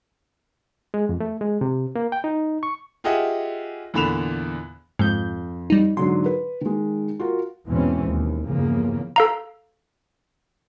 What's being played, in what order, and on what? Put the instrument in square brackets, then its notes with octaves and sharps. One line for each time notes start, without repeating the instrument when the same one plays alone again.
[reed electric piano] G#3
F2
A3
G#3
C3
A#3
G5
D#4
C#6
[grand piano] F4 G4 G#4 D#5 E5 F#5
E2 A#2 D3 B5 E7 F7
[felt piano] F2 [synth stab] G#2 G6
[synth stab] G3 D#4
[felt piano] G#2 D3 F#3 [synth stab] C6
[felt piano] B4
D#3 G#3
F4 F#4 A#4
[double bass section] E2 G#2 B2 E3 C4 C#4
D#2
E2 G2 C#3 F3 A#3
[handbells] A4 F5 A#5